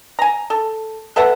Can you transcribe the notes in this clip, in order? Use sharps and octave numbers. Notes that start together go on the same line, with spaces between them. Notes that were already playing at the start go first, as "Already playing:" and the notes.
G#5 A#5
A4
A4 B4 E5 F#5